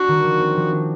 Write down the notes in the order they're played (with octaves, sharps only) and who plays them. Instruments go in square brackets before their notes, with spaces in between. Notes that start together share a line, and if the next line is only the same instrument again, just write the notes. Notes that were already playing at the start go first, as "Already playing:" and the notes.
Already playing: [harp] D4 [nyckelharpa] F#4
[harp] D#3
F3
C4
F3
D4